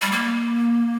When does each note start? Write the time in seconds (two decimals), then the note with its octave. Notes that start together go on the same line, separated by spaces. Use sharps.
0.02 G3
0.11 A#3